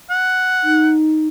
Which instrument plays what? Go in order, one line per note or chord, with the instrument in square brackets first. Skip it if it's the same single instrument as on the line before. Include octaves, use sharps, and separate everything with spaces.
[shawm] F#5
[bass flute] D#4